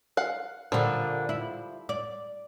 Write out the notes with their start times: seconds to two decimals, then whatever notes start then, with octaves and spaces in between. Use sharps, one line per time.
0.17 F5 F#5
0.72 A#2 D3 F3 G3
1.29 E4
1.89 D5